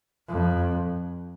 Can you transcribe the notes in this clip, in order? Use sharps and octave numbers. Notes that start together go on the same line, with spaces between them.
F2